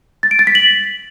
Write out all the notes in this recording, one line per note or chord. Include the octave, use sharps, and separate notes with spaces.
A6
D7
A6
B6
F#7